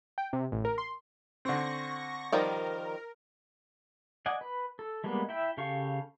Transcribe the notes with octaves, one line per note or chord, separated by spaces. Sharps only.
G5
C3
A1
A#4
C6
D3 C4 C#6 A#6
D#3 F3 G3 A#4
D5 D#5 F#5 G#5
B4
A4
G3 G#3 A#3 B3 B4
E4 E5 G5 B5
C#3 G4 A4 F5 C#6